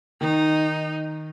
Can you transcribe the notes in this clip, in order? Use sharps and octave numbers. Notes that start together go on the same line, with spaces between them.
D#3 D#4